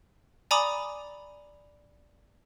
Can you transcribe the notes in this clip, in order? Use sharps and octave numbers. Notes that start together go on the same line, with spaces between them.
D5 G#5 A#5 B5 D6 D#6